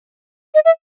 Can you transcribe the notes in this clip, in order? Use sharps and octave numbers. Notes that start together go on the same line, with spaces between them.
D#5
E5